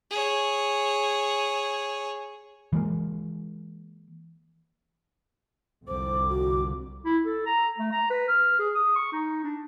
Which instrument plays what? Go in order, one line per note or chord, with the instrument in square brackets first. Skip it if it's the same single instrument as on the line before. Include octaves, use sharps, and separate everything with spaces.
[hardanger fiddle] G#4 C#5
[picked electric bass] E3 G#3 A#3
[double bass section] C2 F2 D3 [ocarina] C5 [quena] D6
[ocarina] F#4
[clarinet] E4
A4
A#5
A3
A#5
B4
F6
G#4
D#6
C#6
D#4
D4